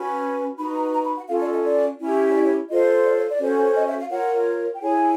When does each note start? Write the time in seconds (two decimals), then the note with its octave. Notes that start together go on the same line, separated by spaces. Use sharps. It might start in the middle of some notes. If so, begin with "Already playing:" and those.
Already playing: C#4 F#4 B4
0.57 D#4 F#4 B4 B5
0.75 A#5
0.93 A#5
1.05 B5
1.16 F#5
1.28 C#4 F4 A4 F5
1.40 D5
1.52 D#5
1.64 D5
1.98 C#4 E4 G4
2.30 C#5
2.33 D5
2.43 C#5
2.69 F4 A4 C5 D#5
3.05 D5
3.17 C#5
3.28 D5
3.39 C#4 F#4 A4 C5
3.75 D#5
3.87 E5
3.98 F5
4.10 F4 A#4 C#5 F#5
4.74 G5
4.81 E4 G#4 C#5 G#5